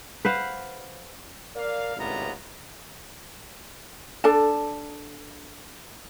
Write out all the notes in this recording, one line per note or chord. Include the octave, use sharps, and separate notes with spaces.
B4 C5 F5 F#5
A#4 D5 F5
G#1 C#2 A2 C3 B3 A#5
D4 A4 D5 A5